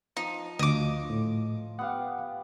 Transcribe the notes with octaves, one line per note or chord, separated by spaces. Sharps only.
F3 D#4
D2 D#5 D6
A2
B3 G4 F5 F#5